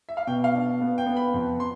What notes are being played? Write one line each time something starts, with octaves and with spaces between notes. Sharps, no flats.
E5
F5
B2 G5
F5
D4
B3
G5
B3
B5
F2
C6